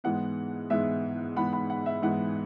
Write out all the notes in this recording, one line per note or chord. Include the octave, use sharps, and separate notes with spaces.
G#2 E3 G#3 B3 F#5
G#2 E3 G#3 B3 E5
G#2 E3 G#3 B3 F#5 B5
F#5 B5
F#5
E5
G#2 E3 G#3 B3 F#5